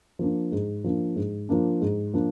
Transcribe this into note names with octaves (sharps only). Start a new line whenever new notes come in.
F3 A#3 D4
G#2
F3 A#3 D4
G#2
F3 A#3 D4
G#2
F3 A#3 D4